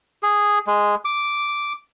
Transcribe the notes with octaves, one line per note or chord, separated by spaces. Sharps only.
G#4
G#3
D6